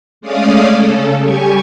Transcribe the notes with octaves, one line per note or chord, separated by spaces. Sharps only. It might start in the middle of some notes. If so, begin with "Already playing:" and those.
G#3 A3 C#4 D5 F5 D#6
C#3 A4
G3 G4 G#5 C#6 G#6